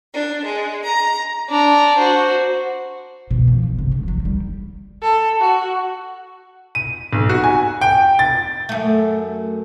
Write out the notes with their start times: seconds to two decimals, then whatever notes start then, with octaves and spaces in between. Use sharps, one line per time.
0.13 D4
0.44 G#3
0.85 A#5
1.50 D4 A#5
1.97 F#4 C5
3.31 B2
3.47 F3
3.63 G2
3.79 C3
3.92 A3
4.08 F#3
4.25 G3
5.02 A4
5.40 F#4
6.75 D#7
7.13 B1
7.29 F#4
7.44 G#5
7.81 G5
8.19 A6
8.69 F#2 A3